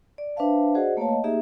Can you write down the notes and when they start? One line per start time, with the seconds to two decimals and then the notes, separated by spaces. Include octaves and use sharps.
0.18 D5
0.36 D4 B4 C5 E5 F5 A5
0.74 F#4 G#4 C5 D5 D#5 F#5
0.97 A3 A#3 B4 C#5 F5 A5
1.09 D#5
1.24 A#3 D#4 G4 G#4 E5